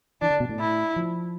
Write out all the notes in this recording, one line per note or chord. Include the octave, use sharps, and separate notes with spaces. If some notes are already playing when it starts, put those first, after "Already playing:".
E3 D4
D3
B2
A2
E4
F3